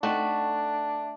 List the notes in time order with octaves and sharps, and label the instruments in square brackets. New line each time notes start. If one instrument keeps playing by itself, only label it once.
[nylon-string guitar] A3 [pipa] C4 D#4 F#4 [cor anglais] D4